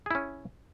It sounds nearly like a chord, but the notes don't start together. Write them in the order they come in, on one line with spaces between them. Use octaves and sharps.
G#4 E4 C#4